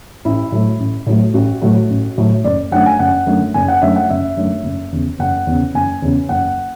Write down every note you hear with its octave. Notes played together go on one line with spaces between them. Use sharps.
A1 E4
A2 F#3 A3
A1
A2 F#3 A3
A1 F#4
A2 F#3 A3
A1
A2 F#3 A3
F#1 D5
F#2 D3 A3 F#5
G#5
F#1 F#5
F#2 D3 A3
F#1 G#5
F#5
F#2 D3 A3 E5
F#5
F#1 E5
F#2 D3 A3
F#1
E2 C#3
F#1 F#5
E2 C#3
F#1 G#5
E2 C#3
F#1 F#5